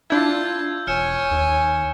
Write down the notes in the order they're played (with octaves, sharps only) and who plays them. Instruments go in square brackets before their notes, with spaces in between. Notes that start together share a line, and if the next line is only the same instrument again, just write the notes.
[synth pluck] D4 E4 [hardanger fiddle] F4 A5 [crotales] E6 G6 G#6
[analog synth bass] E1 [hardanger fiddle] C#5 G#5 [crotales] F6 C#7 E7
[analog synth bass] D#2